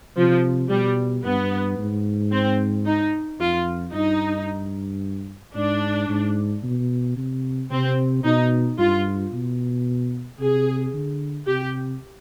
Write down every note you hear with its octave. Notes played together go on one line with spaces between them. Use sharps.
C3 F3
B2 G3
G2 B3
G#2
C4
D#4
F2 F4
G2 D#4
G#2 D4
G#2
B2
C3
C3 C4
B2 D#4
G2 F4
B2
C3 G#4
D3
C3 G4